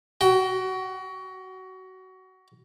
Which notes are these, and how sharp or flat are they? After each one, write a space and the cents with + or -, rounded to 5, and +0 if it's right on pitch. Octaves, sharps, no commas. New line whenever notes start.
F#4 +20 G5 -10